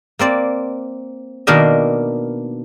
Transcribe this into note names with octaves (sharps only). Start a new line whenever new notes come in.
A#3 C4 D5
B2 D#3 A#3 D4 A#4 D#5